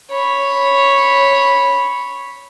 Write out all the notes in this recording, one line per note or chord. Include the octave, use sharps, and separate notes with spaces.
C#5 B5